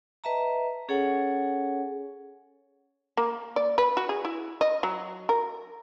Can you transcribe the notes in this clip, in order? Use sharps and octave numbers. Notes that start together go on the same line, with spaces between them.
B4 D#5 E5 A5 A#5
C#4 G#4 A4 C#5 F#5 G#5
A#3
D5
B4
F#4
G#4
E4
D#5
F#3
A#4